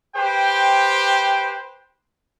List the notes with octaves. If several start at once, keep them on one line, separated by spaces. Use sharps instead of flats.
G4 B4 C5 G5